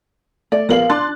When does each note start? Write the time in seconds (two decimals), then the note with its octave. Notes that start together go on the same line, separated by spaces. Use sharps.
0.52 A3 D5
0.69 A#1 B3 A#4 F5 F#7
0.90 D4 C6 F#6 A6